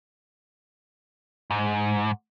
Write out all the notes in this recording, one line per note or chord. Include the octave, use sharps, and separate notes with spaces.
G#2